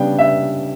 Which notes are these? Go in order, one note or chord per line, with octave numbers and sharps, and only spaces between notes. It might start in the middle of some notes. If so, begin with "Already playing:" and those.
Already playing: C#3 G3 B3 D4 G5
E5